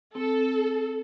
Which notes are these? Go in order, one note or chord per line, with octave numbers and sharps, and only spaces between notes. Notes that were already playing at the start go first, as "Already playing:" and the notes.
C4 A4